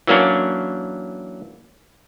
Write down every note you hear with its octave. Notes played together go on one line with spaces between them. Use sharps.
E3 F#3 A#3 C#4 D4 C#5